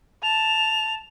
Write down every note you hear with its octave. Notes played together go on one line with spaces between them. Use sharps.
A5 F7